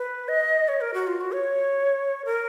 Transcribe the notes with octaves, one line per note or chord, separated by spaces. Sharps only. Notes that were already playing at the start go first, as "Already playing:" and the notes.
Already playing: B4
D#5
C#5
A#4
F#4
F4
F#4
C#5
A#4